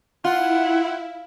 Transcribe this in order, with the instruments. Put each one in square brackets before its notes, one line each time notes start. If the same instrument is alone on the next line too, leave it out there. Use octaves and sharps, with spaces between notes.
[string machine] E4 [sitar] F4 [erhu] F#5